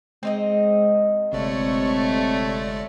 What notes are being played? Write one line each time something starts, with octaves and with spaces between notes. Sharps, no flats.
G#3 C4 D#4 D#5
G1 C3 G#3 A3 C#5 D5